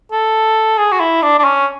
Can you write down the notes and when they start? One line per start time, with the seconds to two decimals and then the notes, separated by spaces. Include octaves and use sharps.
0.12 A4
0.78 G#4
0.92 F#4
1.00 E4
1.22 D4
1.39 D4
1.44 C#4